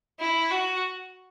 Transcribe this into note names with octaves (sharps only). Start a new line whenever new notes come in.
E4
F#4